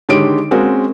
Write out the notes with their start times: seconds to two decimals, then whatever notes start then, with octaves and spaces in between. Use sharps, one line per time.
0.09 D3 D#3 G#3 G4 C#5 D7
0.51 G#3 A#3 C4 C#4 F#4